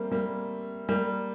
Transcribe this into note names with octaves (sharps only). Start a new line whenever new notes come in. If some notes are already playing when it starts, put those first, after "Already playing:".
Already playing: G3 A3 A#3 C4
G3 A#3
G3 A#3